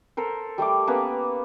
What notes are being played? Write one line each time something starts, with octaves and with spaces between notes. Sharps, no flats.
A4 A#4 C5
G3 A3 G4 D6
A#3 B3 C#4 B4